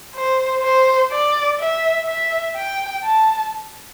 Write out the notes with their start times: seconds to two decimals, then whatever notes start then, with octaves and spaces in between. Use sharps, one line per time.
0.16 C5
0.63 C5
1.12 D5
1.59 E5
2.07 E5
2.56 G5
3.04 A5